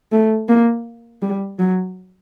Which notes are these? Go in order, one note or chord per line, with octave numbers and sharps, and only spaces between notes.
A3
A#3
G3
F#3